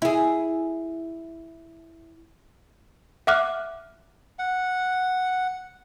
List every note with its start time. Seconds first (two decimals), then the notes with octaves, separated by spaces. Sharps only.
0.02 E4 G#4
3.27 E5 F#5 D6 F6 F#6
4.39 F#5